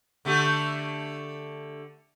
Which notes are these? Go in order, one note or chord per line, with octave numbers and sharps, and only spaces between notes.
D3 A3 G4